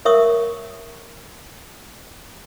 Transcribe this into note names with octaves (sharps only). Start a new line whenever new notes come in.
A#4 C#5 E5 C#6 D#6